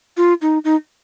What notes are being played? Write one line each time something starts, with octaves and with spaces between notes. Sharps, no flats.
F4
D#4
D#4